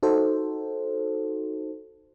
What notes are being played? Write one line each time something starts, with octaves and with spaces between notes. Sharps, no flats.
D#4 F#4 A4 C5